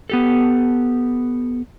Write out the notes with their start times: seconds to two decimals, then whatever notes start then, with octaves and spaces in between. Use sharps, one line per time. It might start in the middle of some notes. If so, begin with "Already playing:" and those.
0.10 B3 G4 A4